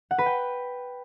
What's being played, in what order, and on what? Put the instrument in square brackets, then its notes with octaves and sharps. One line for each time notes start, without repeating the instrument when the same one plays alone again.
[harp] F#5
B4
G5